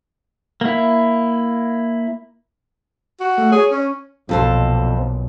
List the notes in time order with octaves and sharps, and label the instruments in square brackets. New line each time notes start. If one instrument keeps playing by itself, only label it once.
[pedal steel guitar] A#3 E4
[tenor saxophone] F#4
[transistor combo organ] A3
[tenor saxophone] G#4 [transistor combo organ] C#5
[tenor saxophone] C#4
[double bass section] B1 A#2 [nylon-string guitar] F2 A4 C5